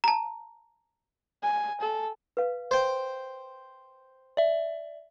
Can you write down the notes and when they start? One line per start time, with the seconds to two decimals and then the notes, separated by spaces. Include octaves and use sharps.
0.04 A5 A#5
1.43 G#5
1.81 A4
2.37 B4 F5
2.71 C5 G5
4.37 D5 E5